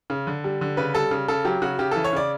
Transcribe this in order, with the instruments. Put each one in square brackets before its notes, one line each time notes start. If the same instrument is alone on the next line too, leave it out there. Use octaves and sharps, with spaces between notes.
[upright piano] C#3
D3
G3
D3
C#3 B4
G3 A4
C#3
C#3 A4
F#3 G4
C#3 F#4
C#3 G4
E3 A4
C#5
C#3 D5